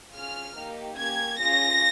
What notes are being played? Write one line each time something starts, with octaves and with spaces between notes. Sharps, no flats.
C#4 F4 G#4 F6
A#3 D#4 G4
A#3 C#4 G4 G#6
C#4 F4 G#4 A#6